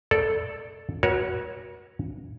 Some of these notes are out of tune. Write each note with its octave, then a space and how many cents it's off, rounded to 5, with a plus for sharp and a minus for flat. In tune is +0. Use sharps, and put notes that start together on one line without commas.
A4 +0 D5 +0
F#4 +0 A#4 +45 C#5 +0